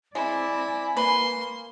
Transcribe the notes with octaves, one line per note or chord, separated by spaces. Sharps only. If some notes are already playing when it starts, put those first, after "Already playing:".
G#3 C4 E4 D5 G#5
A#3 B4 C6